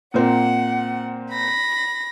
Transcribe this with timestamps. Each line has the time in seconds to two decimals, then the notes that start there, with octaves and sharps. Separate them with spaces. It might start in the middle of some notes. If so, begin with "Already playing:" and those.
0.14 A#2 A#3 C4 F#5
1.31 B5 A#6